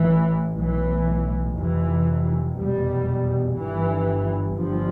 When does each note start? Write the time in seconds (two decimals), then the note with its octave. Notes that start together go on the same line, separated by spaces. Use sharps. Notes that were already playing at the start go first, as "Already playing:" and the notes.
Already playing: A1 A2 E3
0.57 B1 A2 E3
1.56 F1 F2 C3 E3
2.57 F1 E2 B2 G3
3.56 G1 G2 E3
4.56 G1 G2 F3